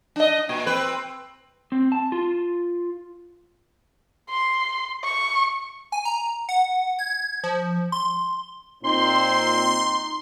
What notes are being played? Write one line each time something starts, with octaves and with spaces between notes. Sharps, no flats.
D4 D#5
A#2
C4 B4
C4
A5
F4
C6
C#6
G#5
A#5
F#5
G#6
F3
C6
A#2 C4 D#4 C6